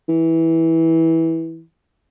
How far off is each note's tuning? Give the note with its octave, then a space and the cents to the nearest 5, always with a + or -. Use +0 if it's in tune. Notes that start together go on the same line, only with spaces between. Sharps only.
E3 -15